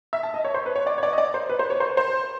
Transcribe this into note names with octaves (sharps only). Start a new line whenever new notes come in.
E5
A5
D#5
C#5
C5
B4
C#5
D5
C#5
D5
D#5
D5
C5
B4
C5
C#5
C5
C5